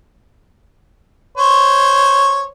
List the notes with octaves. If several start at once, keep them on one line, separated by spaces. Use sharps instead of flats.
C5 C#5